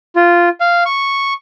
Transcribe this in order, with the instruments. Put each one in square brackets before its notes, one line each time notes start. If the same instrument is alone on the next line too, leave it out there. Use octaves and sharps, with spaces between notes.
[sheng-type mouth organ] F4
F5
C#6